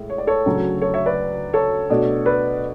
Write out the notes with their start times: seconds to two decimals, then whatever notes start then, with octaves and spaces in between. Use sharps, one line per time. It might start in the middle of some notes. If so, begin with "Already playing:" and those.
Already playing: A2 G#3
0.10 C#5
0.18 D5
0.27 A4 C#5
0.46 D2 C#3 F#3
0.82 A4 C#5
0.94 C#5 E5
1.06 B4 D5
1.54 A4 C#5
1.90 B2 A3 D4
2.26 B4 D5